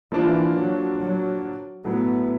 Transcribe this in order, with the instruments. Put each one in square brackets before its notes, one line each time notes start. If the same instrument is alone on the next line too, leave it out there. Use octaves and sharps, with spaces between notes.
[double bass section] E3 [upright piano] F3 A#3 D4 F4
[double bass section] F#3
F#3
[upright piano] A2 F#3 A3 [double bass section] B3